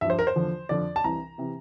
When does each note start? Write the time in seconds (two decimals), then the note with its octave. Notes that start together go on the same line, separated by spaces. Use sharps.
0.01 G2 F3 E5
0.10 C5
0.19 A#4
0.27 C5
0.36 E2 D3 F3
0.69 F2 D3 F3 D5
0.96 A5
1.04 C2 C3 E3 A#5
1.38 C3 E3